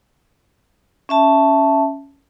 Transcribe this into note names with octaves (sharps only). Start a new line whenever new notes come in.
C#4 E5 A5